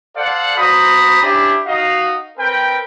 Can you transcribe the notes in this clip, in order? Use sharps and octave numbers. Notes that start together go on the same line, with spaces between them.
A4 C5 D5 F5 F#5
F#4 C5 A#5 B5 D#6
C#4 D4 E4 G4
D#4 F#4 D#5 F5
C4 A#4 B4 G5